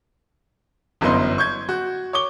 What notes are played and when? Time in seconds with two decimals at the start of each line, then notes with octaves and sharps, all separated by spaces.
1.01 G1 F#2 E3 B3 D#5 C6
1.38 C#6 G6 G#6
1.69 F#4
2.13 C#5 C#6 D6 G7